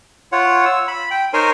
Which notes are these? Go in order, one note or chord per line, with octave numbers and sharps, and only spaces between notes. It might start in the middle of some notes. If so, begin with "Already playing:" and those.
F4 C#5 F#5
E6
B5
G5
D#4 A#4 C5 C#5 G#5 C6